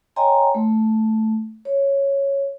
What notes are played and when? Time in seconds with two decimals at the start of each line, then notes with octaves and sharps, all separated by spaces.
0.16 C#5 D#5 G5 G#5 A#5 C6
0.55 A3
1.65 C#5